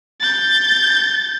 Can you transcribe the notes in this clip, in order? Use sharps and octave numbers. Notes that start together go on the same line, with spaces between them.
G6 A6